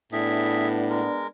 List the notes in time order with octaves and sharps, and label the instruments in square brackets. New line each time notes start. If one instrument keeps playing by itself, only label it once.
[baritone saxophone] A2 [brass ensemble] B3 D4 [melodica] G#4 E5
[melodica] G#3 A#4